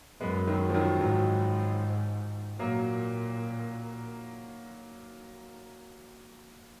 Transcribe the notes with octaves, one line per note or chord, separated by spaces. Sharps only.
F#2 G#3 B3
D#3 F#3
F3
D#3 F#3
G#2 D#3 F#3
A#2 F#3 A#3